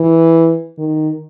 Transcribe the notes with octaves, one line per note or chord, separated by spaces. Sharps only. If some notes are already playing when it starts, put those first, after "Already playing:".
Already playing: E3
D#3